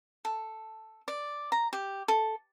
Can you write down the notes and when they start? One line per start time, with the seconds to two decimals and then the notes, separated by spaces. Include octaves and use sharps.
0.25 A4
1.08 D5
1.52 A#5
1.73 G4
2.08 A4